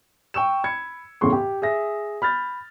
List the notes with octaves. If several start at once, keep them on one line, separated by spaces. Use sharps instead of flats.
G5 C#6 E6 E7
B5 G#6 C#7
E2 A2 C#3 C6 C#6
G4
G#4 E5 A#6
B5 F6 G6 A6